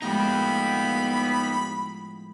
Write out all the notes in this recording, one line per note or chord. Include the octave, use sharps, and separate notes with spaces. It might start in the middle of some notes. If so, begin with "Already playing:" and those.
A2 F3 G#3 B3 D#4 G4 B5